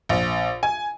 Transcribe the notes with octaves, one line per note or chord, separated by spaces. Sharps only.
A#1
G#5